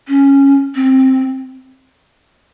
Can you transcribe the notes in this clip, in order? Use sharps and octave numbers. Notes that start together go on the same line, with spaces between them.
C#4
C4